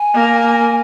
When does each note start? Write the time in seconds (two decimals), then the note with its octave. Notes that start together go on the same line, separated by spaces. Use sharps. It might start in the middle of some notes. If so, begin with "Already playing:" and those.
Already playing: G#5
0.14 A#3